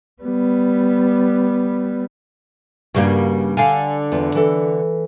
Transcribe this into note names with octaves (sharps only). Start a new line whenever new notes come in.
G3 B3
G2 C#3 G3 A#3 F#4
D3 D4 F5 G#5
E2 F4
E3 A4